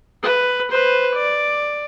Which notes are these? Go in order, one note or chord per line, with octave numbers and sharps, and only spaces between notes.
B4
B4 C5
D5